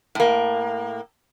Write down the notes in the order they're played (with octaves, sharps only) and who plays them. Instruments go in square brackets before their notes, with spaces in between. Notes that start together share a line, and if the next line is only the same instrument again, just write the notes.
[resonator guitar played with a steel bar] A2 A#3